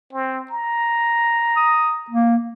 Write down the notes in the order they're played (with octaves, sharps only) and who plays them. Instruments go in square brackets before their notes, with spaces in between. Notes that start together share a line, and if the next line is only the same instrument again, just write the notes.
[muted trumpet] C4
A#5
[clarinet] D#6
A#3